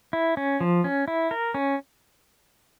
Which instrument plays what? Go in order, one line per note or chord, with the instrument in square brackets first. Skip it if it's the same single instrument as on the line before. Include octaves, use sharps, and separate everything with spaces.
[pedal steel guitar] E4
C#4
F3
C#4
E4
A#4
C#4